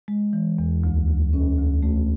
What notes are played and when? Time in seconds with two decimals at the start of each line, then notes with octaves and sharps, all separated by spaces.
0.08 G#3
0.33 E3
0.58 E2
0.84 D2
1.08 D2
1.33 C#4
1.58 D2
1.83 A3